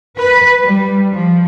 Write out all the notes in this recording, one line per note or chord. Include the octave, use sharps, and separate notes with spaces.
B4
G3
F3